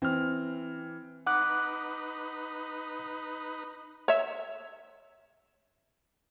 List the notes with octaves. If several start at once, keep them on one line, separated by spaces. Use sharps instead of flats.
E3 C4 F6
D#4 B4 F#5 D6 F#6
C#5 E5